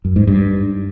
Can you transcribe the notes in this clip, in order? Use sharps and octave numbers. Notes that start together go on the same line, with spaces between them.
F#2
G#2
G2